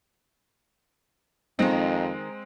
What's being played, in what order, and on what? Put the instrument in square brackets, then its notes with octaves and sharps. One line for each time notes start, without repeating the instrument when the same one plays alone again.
[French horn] F2 [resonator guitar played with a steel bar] D#3 D#4 [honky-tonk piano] G#3 C4